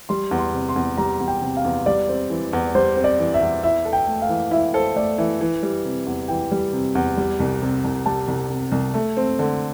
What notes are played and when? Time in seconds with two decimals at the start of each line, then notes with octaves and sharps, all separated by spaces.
0.09 G3 C6
0.31 E2
0.39 C6
0.53 C3
0.69 C6
0.76 E2
0.98 G3 A#5
1.20 E2
1.28 G5
1.42 C3
1.57 F5
1.65 E2
1.86 G3 D5
2.09 C4
2.30 E3
2.53 E2
2.75 G3 C5
2.96 C4
3.04 D5
3.19 E3
3.34 E5
3.42 E2
3.63 E4 E5
3.85 A4
3.93 G5
4.07 A3
4.22 F5
4.29 E3
4.51 E4 E5
4.74 A4 C5
4.96 A3 D5
5.18 E3 E5
5.41 E3
5.63 G3
5.85 C3
6.06 E2
6.28 E3 G5
6.52 G3
6.73 C3
6.95 E2
7.17 G3
7.40 C2
7.62 C3
7.84 C2
8.06 G3 A5
8.28 C2
8.50 C3
8.72 C2
8.94 A3
9.17 C4
9.39 D3